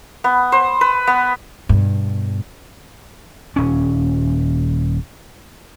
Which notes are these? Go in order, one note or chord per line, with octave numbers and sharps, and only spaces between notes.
B3
C5
B4
B3
G2 B2
D#1 C#4